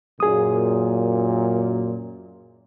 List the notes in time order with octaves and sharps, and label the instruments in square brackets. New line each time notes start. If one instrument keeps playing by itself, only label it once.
[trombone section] F#2 A#2 [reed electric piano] G#4 D#6